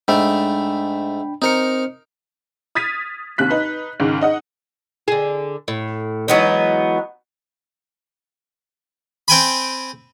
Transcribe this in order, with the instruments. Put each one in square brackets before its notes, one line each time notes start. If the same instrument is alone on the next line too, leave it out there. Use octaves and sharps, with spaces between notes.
[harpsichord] G#2 A3 [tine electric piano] D4 G5 B5
[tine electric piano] C4 C5 C#7 [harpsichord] D#4 A#4
[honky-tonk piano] D#6 F6 G#6 A6 B6 D#7
D#2 C3 F#6 B6
D#4 B4
C#2 G#2 D#3
D#4 D#5 F#5
[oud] D3 G#4
A2
[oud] E3 G#3 [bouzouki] F#3 B3 D#4
[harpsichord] C4 G5 G#5 B5